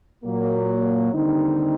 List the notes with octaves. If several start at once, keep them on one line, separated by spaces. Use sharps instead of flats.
A#2 F#3 A#3
D#2 D3 G3 C4 D#4